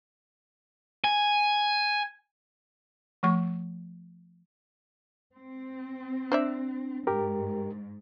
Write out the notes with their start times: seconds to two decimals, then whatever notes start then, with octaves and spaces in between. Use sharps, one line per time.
1.04 G#5
3.23 F3 A3 C#6
5.35 C4
6.32 D4 C5 D5 E5
7.07 G#2 G4 A#4